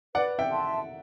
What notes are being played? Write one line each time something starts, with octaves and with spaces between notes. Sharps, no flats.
B4 D5 F#5
E5 G5
E5 A5 C6